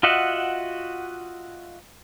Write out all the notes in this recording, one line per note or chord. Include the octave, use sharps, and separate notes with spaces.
F4 F#4 D#5 E5 F#5